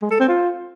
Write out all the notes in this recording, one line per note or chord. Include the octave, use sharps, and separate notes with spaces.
G#3
A4
C4
F4